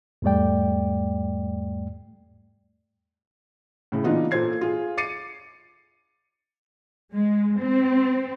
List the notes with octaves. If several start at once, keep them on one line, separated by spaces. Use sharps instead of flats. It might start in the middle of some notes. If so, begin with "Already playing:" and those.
E2 G#2 G3 A3 D5 G5
A2 C#3
A#2 E3 B3 D4 D#4 F4
A#2 F4 A4 C5 G#6 C7
F4 G#4
D6 A6 C7 C#7 D#7
G#3
C4